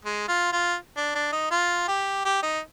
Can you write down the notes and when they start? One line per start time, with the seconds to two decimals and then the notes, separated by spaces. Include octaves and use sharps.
0.05 G#3
0.28 F4
0.53 F4
0.97 D4
1.15 D4
1.32 D#4
1.51 F4
1.88 G4
2.25 G4
2.43 D#4